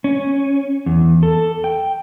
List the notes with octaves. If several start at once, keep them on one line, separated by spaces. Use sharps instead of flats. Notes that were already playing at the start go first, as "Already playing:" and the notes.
C#4
E2
A4
G5